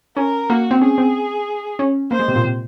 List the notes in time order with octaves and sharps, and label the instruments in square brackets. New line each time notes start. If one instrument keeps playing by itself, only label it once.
[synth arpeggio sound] C#4 [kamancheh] A#4
[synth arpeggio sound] A#3 [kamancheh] F#4
[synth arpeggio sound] C4
[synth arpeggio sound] C#4 [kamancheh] G#4
[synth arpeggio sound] C4
C#4
[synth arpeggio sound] A#3 [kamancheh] C5
[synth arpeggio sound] G#3
C3
A#2
C3